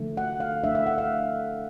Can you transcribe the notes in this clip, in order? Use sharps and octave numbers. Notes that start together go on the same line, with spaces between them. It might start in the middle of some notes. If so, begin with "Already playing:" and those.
Already playing: D3 F3 A3
F#5
F5
F3 A3 D4 E5
E5
F#5
F5